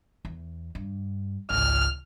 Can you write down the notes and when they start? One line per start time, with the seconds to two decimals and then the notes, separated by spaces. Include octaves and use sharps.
0.25 E2
0.75 G2
1.50 G#1 C#2 F6